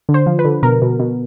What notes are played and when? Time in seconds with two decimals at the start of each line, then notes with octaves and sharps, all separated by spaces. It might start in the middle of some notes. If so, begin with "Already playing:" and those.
0.09 D3
0.14 C5
0.27 F3
0.39 B4
0.45 D3
0.63 B2 A#4
0.82 B2
1.00 B2